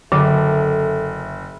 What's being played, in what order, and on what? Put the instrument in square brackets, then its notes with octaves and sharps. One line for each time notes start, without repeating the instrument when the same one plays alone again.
[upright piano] F#1 [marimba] D3 D6 [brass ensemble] A4 E5